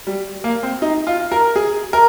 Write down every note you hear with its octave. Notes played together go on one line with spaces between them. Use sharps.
G3
A#3
C4
D#4
F4
A#4
G#4
A#4